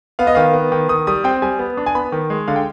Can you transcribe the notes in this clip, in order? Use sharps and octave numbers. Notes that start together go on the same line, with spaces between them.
B3 F5
D#5
D#3 F5
B3
D#3
D#3 D#6
G3 D#6
C4 G5
G3 G#5
B3
D4
G#5
B3 B5
D#3
G#3
D3 F5
G5